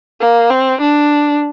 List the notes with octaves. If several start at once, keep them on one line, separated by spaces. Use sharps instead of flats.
A#3
C4
D4